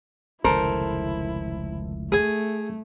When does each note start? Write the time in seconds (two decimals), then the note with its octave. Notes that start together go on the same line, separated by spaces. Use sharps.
0.44 F1 C#2 D#3 E4 A4 A#4 C5
2.12 A3 G#4